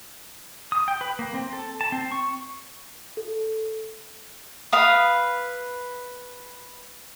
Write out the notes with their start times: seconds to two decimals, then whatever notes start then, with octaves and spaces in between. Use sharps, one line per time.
0.72 D#6
0.88 G5
1.01 B4
1.19 A#3
1.34 C4
1.53 A4
1.81 A5
1.92 C4
2.12 C#6
3.17 A4
4.73 B4 F5 D#6